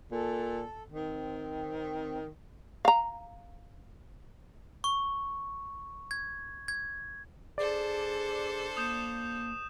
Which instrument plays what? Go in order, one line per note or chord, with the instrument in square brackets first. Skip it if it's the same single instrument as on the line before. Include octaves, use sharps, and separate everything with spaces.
[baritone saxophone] A#2 [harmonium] A4
[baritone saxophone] D#3 [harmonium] C4
[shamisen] F5 A#5
[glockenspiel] C#6
G#6
G#6
[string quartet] D4 A4 C5 [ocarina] G#4 [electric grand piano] D5
[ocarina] A#3 [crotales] D#6 G6 E7